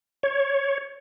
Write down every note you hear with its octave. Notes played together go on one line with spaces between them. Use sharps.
C#5